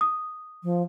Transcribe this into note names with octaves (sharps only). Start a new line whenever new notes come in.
D#6
F3